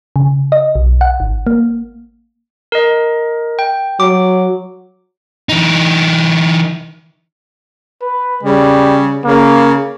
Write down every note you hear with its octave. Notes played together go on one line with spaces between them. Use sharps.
C#3
D#5
B1
F#5
G#1
A#3
A#4 D#5
G5
F#3 D6
E3 D#4
B4
C#3 G3
C#3 A#3